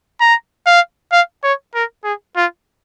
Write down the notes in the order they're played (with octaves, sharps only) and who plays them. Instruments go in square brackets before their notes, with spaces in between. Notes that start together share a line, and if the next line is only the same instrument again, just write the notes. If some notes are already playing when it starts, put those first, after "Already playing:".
[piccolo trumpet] A#5
F5
F5
C#5
A#4
G#4
F4